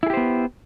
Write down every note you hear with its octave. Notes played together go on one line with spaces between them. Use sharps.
B3 E4 G4 G#4 C5